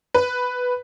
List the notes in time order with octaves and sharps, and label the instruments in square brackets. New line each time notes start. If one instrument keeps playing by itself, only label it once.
[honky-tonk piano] B4